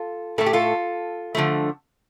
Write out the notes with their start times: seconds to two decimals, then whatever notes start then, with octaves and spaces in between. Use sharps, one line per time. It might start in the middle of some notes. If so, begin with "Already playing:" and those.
Already playing: F4 A4
0.38 A2 A3 A4
0.46 G4
0.53 F4 A4
1.35 D3 F3 A3